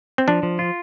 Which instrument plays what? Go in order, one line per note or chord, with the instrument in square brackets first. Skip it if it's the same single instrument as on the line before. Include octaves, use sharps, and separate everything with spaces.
[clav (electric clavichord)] C4
[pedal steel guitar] F3 [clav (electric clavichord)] D4
[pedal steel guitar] F3
F4